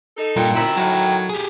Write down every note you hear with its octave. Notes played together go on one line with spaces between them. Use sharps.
D#4 A4
G2 A#2 G5
F#2 C4 E4 G5 A#5
A2 D#3 F#3
G4 G#4